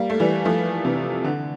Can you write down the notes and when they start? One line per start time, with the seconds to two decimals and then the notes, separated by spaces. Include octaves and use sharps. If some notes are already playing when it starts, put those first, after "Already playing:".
Already playing: G3 A#3
0.10 A3
0.20 E3 G3
0.45 F3 A3
0.85 C3 E3
1.24 D3